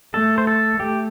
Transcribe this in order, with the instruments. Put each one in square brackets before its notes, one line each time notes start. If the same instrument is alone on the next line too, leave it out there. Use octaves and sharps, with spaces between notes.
[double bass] A3 [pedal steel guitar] A4
[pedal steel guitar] C5
A4
[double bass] A3 [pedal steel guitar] G4